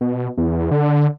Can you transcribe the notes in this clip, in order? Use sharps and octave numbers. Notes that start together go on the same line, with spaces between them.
B2
E2
D3